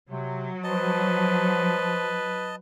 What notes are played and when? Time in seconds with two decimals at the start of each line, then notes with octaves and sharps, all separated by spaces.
0.10 C3 F#3
0.64 F3 B4 D#5 A5